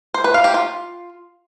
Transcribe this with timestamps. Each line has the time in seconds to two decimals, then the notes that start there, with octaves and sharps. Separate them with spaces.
0.14 C5
0.24 B4
0.34 F5
0.44 G4
0.54 F4